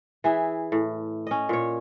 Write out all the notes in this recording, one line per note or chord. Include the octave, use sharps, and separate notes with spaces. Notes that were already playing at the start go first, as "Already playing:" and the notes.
E3 G#4 E5
A2
C#4 D#5
A#2 C#5